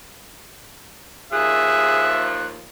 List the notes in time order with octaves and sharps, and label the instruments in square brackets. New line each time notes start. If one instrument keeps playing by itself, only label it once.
[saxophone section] D#2 F3 [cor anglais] G#4 [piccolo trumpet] E5 [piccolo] F#6